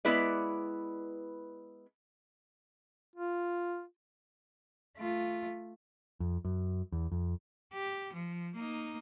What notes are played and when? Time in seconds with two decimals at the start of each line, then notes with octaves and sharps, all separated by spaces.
0.05 G#3 B3 E4 B4 D5
3.16 F4
4.98 A3 F4
6.20 F2
6.45 F#2
6.92 E2
7.12 F2
7.74 G4
8.14 F3
8.56 A#3 D#4